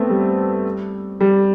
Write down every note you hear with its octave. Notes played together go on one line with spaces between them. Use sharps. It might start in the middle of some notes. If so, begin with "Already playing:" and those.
Already playing: A3 B3 C4
G3
G3